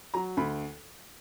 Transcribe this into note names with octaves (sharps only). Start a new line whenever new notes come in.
F#3 A#5
D2 B5